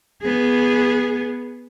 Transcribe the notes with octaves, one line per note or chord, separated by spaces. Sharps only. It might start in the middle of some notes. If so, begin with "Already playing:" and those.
B3 G#4